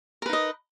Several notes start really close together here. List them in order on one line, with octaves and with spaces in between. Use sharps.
A#4 B4 D#4 D#5